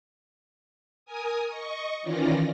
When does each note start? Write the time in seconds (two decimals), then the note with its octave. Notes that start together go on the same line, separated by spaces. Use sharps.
1.06 A#4 G#5 D#6
1.48 D#5 C#6
2.02 D#3 E3 C#4 F4 D5 A#6